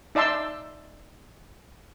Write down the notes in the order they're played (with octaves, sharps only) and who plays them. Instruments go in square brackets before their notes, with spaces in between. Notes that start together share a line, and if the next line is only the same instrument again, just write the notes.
[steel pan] D#4 D5 E5 A5 C6 E6